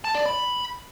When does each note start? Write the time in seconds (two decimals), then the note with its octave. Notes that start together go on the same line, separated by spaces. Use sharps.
0.04 A5
0.15 D5
0.26 B5